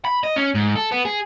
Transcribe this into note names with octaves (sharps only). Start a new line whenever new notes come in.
B5
D#5
C#4
G#2
A4
B3
G#4